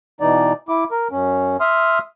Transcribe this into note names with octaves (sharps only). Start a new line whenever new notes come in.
B2 E3 D#4 D5
E4 D6
A#4
F#2 C#4
E5 C6 D#6 F6